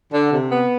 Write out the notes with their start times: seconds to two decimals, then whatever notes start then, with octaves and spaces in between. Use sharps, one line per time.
0.13 D3
0.32 C3
0.51 B3